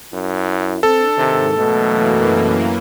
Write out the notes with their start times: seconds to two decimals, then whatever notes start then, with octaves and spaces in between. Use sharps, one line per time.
0.13 F#2 E4
0.83 C4 D4 A4
1.18 G#2 C3 D#3
1.57 F#2 B2 E3 A3 A#3